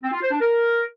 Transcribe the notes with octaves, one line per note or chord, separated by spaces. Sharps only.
C4
F4
C5
D4
A#4